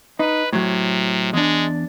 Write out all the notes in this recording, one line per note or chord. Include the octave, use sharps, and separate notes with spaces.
D#4 B4
A2 C3 F#3
E2 G#3 D4